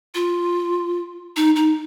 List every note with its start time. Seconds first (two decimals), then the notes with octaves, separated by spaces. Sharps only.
0.15 F4
1.36 D#4
1.56 D#4